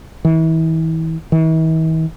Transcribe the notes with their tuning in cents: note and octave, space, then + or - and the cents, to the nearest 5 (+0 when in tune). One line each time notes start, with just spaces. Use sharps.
E3 -35
E3 -45